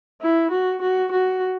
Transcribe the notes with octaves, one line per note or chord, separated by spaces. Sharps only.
E4
F#4
F#4
F#4